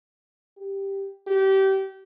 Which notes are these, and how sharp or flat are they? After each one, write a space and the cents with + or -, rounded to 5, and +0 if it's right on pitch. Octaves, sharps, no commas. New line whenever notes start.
G4 +0
G4 -25